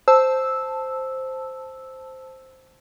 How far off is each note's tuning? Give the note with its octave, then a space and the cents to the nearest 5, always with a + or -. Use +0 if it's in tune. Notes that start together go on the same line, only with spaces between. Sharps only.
C5 +0 A5 +0 E6 -5